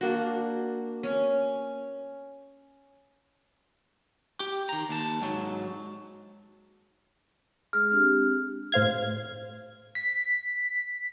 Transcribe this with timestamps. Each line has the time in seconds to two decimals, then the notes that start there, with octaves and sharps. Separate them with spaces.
0.01 A#3 D4 F#4
1.03 C#4
4.40 G4
4.69 D#3 A#5
4.89 D#2 A5
5.21 G#2 F#3
7.73 G#3 G#4 F6
7.91 C4 D4 G4
8.72 A2 C5 F5 G#6
9.95 B6